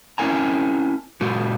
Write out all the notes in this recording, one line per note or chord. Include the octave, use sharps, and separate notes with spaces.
C4 C#4 E4 A#4 G#5 A#5
A#2 G#3 F#4 G4